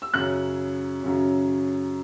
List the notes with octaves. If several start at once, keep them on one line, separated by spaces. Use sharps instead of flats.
E6
F#2 C#3 F#3 C#4 F#6
F#2 C#3 F#3 C#4